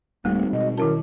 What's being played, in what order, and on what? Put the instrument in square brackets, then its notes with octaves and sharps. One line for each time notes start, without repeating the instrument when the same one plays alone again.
[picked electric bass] D1 A#3 C4 [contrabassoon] G#1 [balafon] G3 [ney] A3
[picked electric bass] B2 [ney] D#5
[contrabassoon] F#2 [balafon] D#3 E4 A5 [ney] A#4